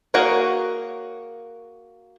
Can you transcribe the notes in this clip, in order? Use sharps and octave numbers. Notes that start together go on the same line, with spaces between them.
A#3 F#4 G#4 A#4 C#5